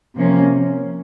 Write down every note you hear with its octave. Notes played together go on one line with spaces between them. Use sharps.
C3 F3 A#3 C#4